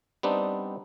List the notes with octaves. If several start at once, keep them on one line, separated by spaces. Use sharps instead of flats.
G3 B3 C4 D4 D#4